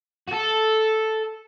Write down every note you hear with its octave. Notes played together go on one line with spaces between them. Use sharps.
F#4
A4